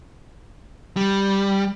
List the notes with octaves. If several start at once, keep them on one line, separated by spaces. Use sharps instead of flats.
G3